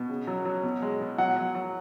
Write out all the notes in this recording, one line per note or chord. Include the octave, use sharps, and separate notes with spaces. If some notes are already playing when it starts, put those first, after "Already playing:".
Already playing: B2
C#3
F#3
F#3
B2
G#3
B2
F#3 F#5
F#3
F#3